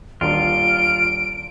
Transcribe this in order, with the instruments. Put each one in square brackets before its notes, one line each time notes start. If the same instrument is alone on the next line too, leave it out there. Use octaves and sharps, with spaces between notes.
[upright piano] D#1 D4 [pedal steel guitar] F4 [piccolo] D7